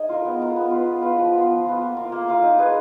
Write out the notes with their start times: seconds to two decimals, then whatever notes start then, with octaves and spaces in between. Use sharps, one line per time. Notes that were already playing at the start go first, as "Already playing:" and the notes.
Already playing: D#4 G#4 D#5
0.09 F4 A#4
0.25 B3
0.40 F4 A#4
0.56 B3
0.71 F4 B4
0.87 B3
1.02 F4 B4
1.18 F3
1.34 B3 F4
1.50 F3
1.65 B3 F4
1.80 A#3
1.97 F4 A#4 F5
2.12 A#3
2.28 F4 A#4 F5
2.43 D#4
2.59 G#4 B4